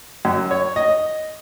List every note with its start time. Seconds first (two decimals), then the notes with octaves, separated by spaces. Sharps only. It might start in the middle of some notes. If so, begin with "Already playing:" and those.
0.25 F#2
0.51 C#5
0.76 D#5